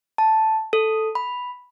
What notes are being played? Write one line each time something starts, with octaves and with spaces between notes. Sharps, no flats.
A5
A4
B5